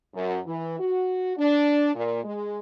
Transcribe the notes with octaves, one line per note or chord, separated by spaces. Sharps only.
F#2
E3
F#4
D4
A#2
G#3